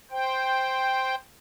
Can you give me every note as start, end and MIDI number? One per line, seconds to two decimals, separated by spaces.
0.11 1.15 72
0.11 1.15 79